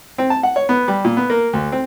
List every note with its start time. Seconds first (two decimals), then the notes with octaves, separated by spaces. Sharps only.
0.18 C4
0.30 A5
0.43 F#5
0.56 C#5
0.69 B3
0.88 G3
1.05 A#2
1.17 B3
1.30 A#3
1.53 D2
1.72 C4